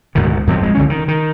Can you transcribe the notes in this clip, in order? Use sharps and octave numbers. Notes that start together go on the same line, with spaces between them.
D2 G#2 B2 D#3
F2 F3 F#3 C4
D#1 G#3
C2 D3 C#4
D#3
D#3